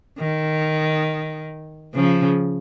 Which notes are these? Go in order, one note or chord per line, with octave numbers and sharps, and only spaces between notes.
D#3
C#3 F3